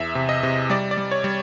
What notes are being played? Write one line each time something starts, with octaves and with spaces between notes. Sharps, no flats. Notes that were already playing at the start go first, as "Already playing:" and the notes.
Already playing: E2 E5
C3
D#5
C3
G3 D5
D5
G3
C#5
G3